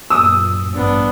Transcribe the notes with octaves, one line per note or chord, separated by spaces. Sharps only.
F#2 A#2 D#6 E6
A1 G2 B3 D4